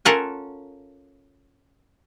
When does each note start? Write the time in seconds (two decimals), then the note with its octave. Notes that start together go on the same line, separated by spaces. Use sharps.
0.05 C#4 F4 A4 A#4 F#5 G#5